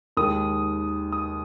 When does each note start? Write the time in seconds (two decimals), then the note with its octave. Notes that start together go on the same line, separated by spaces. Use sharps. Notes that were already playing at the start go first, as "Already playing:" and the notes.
0.17 D#2 D#3 G#3 D#6
1.12 D#6